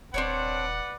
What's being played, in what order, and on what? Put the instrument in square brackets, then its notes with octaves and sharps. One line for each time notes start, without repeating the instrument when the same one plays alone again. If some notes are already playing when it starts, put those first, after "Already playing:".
[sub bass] D#1 [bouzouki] C4 D4 C#5 [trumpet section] B4 D5 F#5